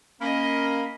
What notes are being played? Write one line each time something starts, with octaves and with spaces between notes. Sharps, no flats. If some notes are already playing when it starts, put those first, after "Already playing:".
A#3 C#4 D#5 B5